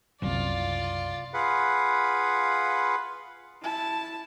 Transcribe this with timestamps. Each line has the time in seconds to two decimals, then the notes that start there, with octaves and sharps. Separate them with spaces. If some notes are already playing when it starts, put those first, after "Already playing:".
0.22 F#1 C2 F4 D5
1.34 F4 G#4 B4 F5 F#5 B5
3.62 E4 A5